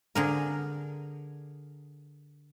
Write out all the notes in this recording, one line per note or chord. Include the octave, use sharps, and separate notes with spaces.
D3 G#4 A#4